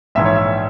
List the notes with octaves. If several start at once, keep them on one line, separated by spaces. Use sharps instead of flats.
A#1 G#2 E3 E5
C#5
E5